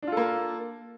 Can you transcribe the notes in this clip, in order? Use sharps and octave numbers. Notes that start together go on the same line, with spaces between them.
A#3 D4 F4 A4